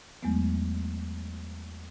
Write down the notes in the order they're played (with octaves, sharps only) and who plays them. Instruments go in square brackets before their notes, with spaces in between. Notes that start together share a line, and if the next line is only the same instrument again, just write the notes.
[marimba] E2 F#3 G#3 A3 B3